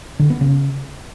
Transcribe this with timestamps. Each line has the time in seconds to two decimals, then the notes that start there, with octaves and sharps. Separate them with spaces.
0.19 D3
0.30 B3
0.41 C#3